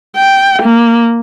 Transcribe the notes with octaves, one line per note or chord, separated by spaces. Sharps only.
G5
A#3